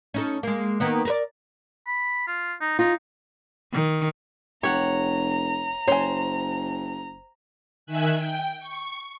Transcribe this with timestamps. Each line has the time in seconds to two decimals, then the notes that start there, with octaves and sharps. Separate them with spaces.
0.14 C#4 D#4 A4
0.43 G#3 A#3
0.80 D#3 A#3 B3
1.05 A#4 B4 D5
1.87 B5
2.27 F4
2.61 D#4
2.79 D#4 F4
3.73 D#3
4.63 F1 G4 C#5 F#5 A#5
5.88 F#1 C5 C#5 G#5
7.86 D#3 E5 G#5 F#6
8.16 G5
8.60 C#6